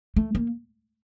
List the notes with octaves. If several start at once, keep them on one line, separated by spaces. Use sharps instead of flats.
A3
A#3